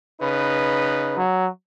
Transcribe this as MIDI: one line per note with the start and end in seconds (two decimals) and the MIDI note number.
0.21 1.20 49
0.21 1.20 63
0.21 1.20 71
1.17 1.49 54